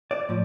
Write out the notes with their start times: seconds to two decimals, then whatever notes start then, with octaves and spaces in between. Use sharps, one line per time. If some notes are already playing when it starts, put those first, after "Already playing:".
0.11 D5
0.29 A2 F3